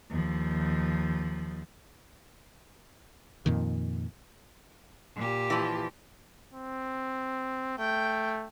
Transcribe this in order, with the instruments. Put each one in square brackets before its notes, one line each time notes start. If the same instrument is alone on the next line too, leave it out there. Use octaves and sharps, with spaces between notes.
[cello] D#2 F3
[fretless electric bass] F2 A#2 D#3
[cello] A#2 G4
[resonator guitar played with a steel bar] E3 F3
[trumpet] C4
[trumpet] A3 [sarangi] G5